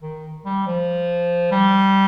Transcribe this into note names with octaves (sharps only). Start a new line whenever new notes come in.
D#3
G3
F3
G3